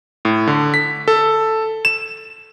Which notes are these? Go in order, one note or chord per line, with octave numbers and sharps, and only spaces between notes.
A2
D3
B6
A4
E7